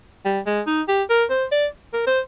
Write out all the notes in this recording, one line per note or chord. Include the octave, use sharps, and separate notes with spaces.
G3
G#3
D#4
G4
A#4
C5
D5
A#4
C5